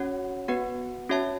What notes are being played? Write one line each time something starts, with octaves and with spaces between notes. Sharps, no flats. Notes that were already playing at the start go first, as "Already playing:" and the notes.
Already playing: C#4 F#4 C#5 F#5
B3 F#4 B4 F#5
C#4 F#4 C#5 E5 A5